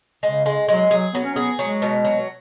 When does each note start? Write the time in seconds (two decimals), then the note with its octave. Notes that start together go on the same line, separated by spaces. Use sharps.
0.23 C#3 G#3
0.46 G#3
0.68 F#3 G#3
0.91 F#3 G#4
1.13 F#3 B3
1.24 C#4
1.35 B3 G#4
1.59 F#3 G#3
1.82 B2
2.05 F#3